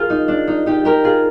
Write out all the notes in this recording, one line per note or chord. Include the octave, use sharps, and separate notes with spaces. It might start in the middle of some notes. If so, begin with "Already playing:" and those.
Already playing: F4 G#4 A#4
D#4
D4
D#4
D#4 G4
G4 A#4
F4 G#4